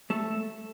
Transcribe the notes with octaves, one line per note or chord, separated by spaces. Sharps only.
A3 A4